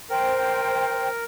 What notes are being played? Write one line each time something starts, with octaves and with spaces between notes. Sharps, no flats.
A#4 C5 G5